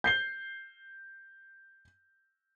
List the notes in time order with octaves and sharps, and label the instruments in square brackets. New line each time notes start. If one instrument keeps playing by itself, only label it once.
[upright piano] G6 C7 G7